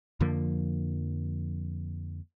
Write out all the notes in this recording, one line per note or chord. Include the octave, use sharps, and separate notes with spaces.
F2 D3 F3 A#3